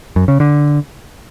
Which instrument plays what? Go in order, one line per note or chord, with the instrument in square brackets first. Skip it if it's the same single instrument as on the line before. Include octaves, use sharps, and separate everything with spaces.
[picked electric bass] F#2
C#3
D3